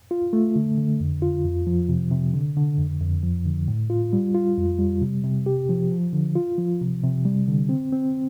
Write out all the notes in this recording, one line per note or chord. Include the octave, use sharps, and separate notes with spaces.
F4
A3
D3
D3
F2
F4
F2
F3
C3
C3
D3
D3
F2
F2
F3
D3
A2
F4
G3
F4
F2
G3
C3
C3
G4
F3
F3
D3
F4
F3
C3
C3
G3
D3
C4
C4